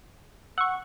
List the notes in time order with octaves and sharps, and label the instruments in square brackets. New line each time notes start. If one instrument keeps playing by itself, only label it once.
[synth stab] F#5 C#6 [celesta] E6